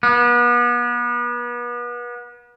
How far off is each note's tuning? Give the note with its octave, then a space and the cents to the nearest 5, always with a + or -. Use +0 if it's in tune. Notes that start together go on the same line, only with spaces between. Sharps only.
B3 -35